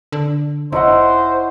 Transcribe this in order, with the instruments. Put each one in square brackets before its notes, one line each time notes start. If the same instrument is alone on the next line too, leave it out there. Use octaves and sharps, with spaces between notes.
[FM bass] D3
[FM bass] F1 [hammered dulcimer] E4 F#5 [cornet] C5 [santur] C#5 D#5 A#5